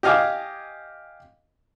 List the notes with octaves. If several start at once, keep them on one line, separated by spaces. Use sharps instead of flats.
G4 D#5 F5 G#5 D6